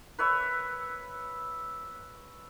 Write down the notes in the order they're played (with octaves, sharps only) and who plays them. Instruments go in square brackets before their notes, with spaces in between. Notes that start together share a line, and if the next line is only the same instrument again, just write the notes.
[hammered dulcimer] B4 C#5 E5